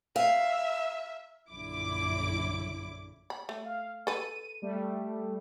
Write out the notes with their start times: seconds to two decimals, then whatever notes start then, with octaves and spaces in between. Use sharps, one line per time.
0.16 E5 F5
1.50 A#1 F#2 D3 E4 D6
3.30 B5
3.49 A3
3.65 F5
4.07 A4 B4 D#7
4.62 G3 A3